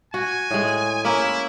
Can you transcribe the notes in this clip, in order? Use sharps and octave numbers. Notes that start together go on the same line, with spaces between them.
F#4 G#5
A2 G#3
A#3 C#4 E4